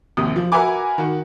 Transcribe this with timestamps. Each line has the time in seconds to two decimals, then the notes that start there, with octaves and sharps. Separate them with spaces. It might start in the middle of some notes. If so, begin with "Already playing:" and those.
0.17 A#1 D#2 C3 D#6
0.36 F3
0.52 F#4 A#4 B4 E5 G#5 D6
0.98 D#3 F#4